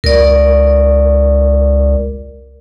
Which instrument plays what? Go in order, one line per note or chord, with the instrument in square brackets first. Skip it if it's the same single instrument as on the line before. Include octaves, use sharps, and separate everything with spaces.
[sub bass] C#2 [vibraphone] A#4 D5